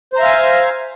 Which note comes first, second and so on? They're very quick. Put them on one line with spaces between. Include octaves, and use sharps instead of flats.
C5 A#5 E5 F5 G#5